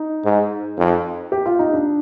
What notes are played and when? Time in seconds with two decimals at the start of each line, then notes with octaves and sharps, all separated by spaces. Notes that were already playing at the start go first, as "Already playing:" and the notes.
Already playing: D#4
0.25 G#2
0.78 F2
1.32 G4
1.46 F4
1.59 D#4
1.73 D4